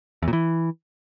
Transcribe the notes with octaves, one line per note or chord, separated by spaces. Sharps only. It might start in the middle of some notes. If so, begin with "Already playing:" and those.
E2
A#2
E3